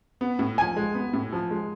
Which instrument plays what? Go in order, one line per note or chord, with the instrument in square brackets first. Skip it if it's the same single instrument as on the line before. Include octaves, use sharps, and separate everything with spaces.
[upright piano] B3
A2
[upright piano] F3 [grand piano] G#5
[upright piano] G#3
B3
A2
F3
G#3